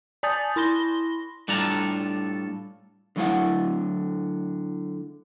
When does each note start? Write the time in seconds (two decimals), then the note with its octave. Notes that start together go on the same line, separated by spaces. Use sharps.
0.23 D5 G#5 A5 D#6 G6 A6
0.56 E4 B5 C6 A#6 G7
1.48 A2 G3 D4 F4 A4 A#5
3.16 D3 F#3 A3 E4 F5 F#5